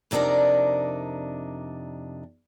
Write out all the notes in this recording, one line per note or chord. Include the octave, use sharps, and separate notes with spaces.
F2 C3 D4 D#4 A#4 D5